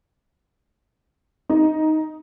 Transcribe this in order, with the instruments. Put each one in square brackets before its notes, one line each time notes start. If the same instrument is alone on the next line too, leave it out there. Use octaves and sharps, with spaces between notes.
[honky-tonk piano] D#4